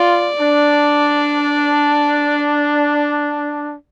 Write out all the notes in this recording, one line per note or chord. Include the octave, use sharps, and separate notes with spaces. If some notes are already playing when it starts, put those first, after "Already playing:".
Already playing: F4 D5
D4